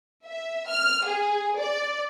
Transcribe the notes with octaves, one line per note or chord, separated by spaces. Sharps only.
E5
F6
G#4
D5